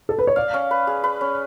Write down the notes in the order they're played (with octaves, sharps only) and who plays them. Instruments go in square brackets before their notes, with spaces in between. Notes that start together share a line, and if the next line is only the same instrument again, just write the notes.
[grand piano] A4
B4
C#5
[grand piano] D5 [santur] F5
[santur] C#4
B4
G#4
B4
C#4